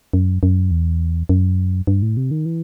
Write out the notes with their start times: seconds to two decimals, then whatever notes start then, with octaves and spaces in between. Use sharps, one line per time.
0.13 F#2
0.43 F#2
0.71 E2
1.29 F#2
1.87 G2
2.02 A2
2.17 C3
2.31 D#3
2.46 E3